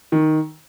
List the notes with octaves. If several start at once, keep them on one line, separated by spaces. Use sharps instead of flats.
D#3